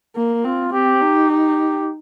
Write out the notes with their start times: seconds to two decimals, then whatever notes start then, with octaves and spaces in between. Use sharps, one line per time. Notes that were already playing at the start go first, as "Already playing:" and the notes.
0.16 A#3
0.44 C4 F4
0.72 C4 G4
1.02 D#4
1.30 G4